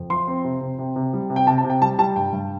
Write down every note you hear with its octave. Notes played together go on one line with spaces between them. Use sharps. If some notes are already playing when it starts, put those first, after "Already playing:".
Already playing: F2
F3 C6
C4
C3
C3
C3
C3
G3
C3
G5
C3 A5
A5
C3
G5
G3 A5
G3 A5
G2 G5
G2